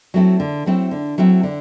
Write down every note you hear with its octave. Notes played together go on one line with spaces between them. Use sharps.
F#3 A3 C4 E4
D3
F#3 A3 C4 E4
D3
F#3 A3 C4 E4
D3